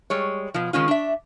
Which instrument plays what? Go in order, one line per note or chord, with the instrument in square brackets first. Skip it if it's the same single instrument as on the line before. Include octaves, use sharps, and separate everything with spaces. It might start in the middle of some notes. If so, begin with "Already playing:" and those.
[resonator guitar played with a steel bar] G3 G#3 C#5
B2 F3
D#3 G#3 C#4 F4
D4 E5